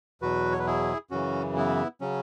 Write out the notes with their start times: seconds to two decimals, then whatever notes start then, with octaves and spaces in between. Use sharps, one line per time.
0.22 E2 B2 F#3 F#4 B4
0.52 C#5
0.59 B4
0.66 E4 G#4
1.11 F#2 C#3 E3 C#4 F#4
1.56 B3 E4
2.01 C#3 F#3 C#4